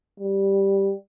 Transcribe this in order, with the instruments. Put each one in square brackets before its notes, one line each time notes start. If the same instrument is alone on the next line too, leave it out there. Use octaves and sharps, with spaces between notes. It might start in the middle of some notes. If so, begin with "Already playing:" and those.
[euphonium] G3